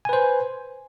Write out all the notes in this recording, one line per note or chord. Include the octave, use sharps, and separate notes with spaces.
B4 C5 G#5